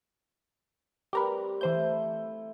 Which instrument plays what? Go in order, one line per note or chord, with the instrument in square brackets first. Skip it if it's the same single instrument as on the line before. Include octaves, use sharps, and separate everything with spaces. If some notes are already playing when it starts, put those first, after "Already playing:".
[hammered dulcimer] G3 C4 [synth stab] G4 A#4 B4
[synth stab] E3 C5 G6 [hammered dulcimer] A3 E4